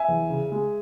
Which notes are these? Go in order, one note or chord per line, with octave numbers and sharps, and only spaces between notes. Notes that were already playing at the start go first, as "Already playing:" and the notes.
Already playing: E5 G#5
E2
C#3
G#3